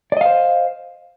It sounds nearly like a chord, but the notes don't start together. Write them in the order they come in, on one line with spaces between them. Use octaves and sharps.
D5 D#5 F5 C5